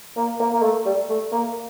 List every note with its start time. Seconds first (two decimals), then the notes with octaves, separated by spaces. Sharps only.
0.17 A#3
0.40 A#3
0.53 A#3
0.62 A3
0.86 G3
1.10 A3
1.32 A#3